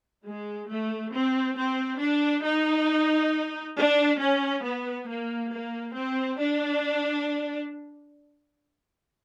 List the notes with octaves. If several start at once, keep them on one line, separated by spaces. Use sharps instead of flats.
G#3
A3
C4
C4
D4
D#4
D4
C#4
B3
A#3
A#3
C4
D4